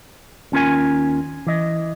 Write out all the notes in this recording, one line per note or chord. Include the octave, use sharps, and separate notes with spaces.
D#2 C#4 F4 A#4 G#5
E3 D#5